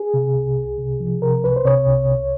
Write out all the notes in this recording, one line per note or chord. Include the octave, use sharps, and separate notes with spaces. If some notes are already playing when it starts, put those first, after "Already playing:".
Already playing: G#4
C3
C2
C2
C3
F3
C3 A#4
C2 B4
C5
C3 C#5
C2
C2